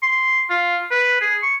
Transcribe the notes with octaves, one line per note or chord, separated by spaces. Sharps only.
C6
F4
B4
G#4
C#6